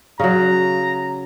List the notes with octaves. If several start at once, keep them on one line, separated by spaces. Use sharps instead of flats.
C#3 F#3 A#5